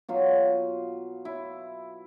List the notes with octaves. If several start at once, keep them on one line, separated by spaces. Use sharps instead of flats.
B2 F#3 F4
E4